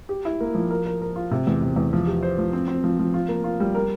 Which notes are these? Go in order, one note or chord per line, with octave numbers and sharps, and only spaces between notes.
G4
E4
A#3
F3
A#4
A#4
A#4
F4
C3
E2
C3
E2
F3
G4
C5
F3
C4
C4
F3
F3
F4
A#3
F4
G3
A#4